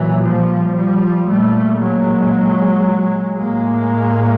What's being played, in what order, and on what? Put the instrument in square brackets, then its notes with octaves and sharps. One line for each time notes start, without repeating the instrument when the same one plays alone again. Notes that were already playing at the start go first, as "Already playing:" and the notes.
Already playing: [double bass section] A#2 E3 F#3
F3 G3
F3 G3
A#2 G3 A3
F#3 G#3
A2 G#3 A#3